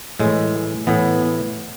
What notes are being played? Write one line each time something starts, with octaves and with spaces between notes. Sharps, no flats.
A2 E3 G#3
A2 E3 B3